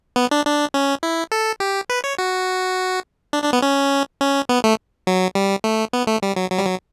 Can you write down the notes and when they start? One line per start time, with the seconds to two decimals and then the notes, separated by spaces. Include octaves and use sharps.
0.16 B3
0.31 D4
0.45 D4
0.74 C#4
1.03 E4
1.32 A4
1.60 G4
1.90 B4
2.04 C#5
2.19 F#4
3.33 D4
3.44 D4
3.53 B3
3.62 C#4
4.21 C#4
4.49 B3
4.64 A3
5.07 F#3
5.35 G3
5.64 A3
5.93 B3
6.07 A3
6.23 G3
6.36 F#3
6.51 F#3
6.58 G3
6.66 F#3